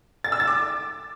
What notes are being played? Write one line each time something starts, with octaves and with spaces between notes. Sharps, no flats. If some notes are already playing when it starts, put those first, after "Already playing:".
A6
E6
A6
D6